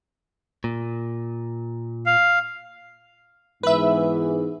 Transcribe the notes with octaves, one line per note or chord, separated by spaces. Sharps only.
A#2
F5
G#2 E3 B3 B4 E5